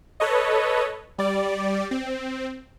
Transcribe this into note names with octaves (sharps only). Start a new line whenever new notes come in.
A4 B4 C#5 D#5
G3 D5
C4